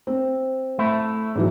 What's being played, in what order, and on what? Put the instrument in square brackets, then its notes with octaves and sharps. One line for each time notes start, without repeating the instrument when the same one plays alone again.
[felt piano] C4
[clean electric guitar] A3 E4
[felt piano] G#2 E3 F#3